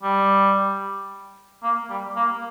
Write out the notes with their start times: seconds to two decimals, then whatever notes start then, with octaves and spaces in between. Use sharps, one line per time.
0.03 G3
1.63 A#3
1.90 G3
2.16 A#3